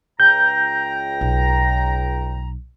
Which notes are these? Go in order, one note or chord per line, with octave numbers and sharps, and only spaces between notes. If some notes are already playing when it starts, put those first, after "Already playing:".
C#2 G5 A#5 G6
B1